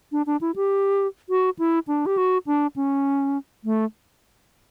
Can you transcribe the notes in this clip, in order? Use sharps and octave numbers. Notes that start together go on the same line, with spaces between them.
D4
D4
E4
G4
F#4
E4
D4
G4
F#4
D4
C#4
A3